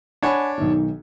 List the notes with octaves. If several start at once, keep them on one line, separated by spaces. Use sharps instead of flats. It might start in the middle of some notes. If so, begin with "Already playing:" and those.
D4 C#5 F#5 G#5 B5
B1 D#3